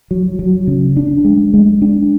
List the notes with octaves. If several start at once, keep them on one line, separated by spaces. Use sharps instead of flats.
F#3
F#3
C#3
D4
G#3
G#3
D4